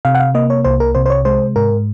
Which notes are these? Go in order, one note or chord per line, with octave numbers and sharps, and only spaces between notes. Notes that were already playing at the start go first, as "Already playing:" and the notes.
C3 F5
F#5
F5
A#3 D#5
C#5
C2 C5
A#4
C3 C5
C5
C#5
G#3 C5
G#2 A#4